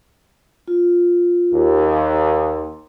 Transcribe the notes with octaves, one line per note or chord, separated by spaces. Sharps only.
F4
D#2
C6